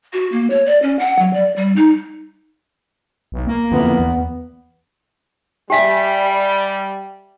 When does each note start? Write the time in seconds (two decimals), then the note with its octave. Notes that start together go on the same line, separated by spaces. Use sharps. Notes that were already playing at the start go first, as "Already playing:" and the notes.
0.13 F#4
0.32 A#3
0.50 C#5
0.66 D5
0.83 C#4
0.99 F#5
1.19 F#3
1.34 D5
1.56 G3
1.76 D#4
3.32 B1
3.47 A#3
3.72 F2 D3 E3 B3
3.99 E2
5.70 G3 G4 E5 G5 G#5 B6